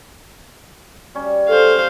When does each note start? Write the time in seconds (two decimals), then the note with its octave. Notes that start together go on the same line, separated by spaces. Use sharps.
1.15 G3 C#4
1.49 A4 C5 F5